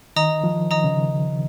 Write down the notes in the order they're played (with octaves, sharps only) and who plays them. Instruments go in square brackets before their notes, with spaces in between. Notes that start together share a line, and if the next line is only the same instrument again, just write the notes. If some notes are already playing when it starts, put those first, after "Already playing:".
[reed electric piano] D#3 [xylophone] D#5 A#5 D#6
[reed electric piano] F3
[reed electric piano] D#3 [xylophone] D#5 A#5 D#6
[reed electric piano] C#3